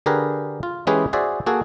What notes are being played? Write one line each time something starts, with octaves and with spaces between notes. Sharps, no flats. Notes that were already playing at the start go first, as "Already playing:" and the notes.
D3 G4 G#4 A#4 B4
F4
E3 G#3 C#4 G4 G#4 B4
F#4 G#4 C5 D5 E5
A#3 F#4 G#4 A4